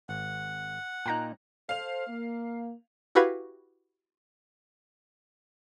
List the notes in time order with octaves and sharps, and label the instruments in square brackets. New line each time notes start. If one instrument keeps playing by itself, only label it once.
[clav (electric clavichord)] G#1 [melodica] F#5
[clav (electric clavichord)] A#2 A#3 D#4 [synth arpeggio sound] G5 A#5 F#6
[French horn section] A4 C5 [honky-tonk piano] F5 F7
[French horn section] A#3
[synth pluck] E4 F#4 G4 B4 F5 G#6